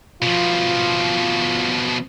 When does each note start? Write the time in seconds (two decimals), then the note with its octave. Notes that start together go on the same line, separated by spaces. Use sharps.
0.22 B2 F3 F4